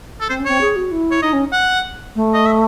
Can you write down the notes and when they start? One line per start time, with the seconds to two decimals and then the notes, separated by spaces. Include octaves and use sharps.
0.21 A4
0.29 C4 C5
0.39 C#4
0.45 C4 C#5
0.61 G#4
0.76 F#4
0.91 E4
1.12 C#5
1.22 D#4 D#5
1.33 C#4
1.53 F#5
2.15 A3
2.34 D#5
2.46 E5